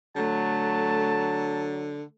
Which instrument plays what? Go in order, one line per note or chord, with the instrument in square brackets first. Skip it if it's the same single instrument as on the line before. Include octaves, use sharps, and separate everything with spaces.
[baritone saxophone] D3 [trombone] F#3 [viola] A3 [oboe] A5